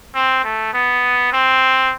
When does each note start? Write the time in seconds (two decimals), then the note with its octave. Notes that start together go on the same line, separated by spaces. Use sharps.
0.15 C4
0.44 A3
0.74 B3
1.33 C4